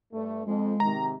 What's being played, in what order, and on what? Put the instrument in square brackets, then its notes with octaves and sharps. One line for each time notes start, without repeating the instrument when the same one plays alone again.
[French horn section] G2 A3
[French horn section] F2 [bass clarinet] G#3
[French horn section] G#2 C3 D#3 [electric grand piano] A#5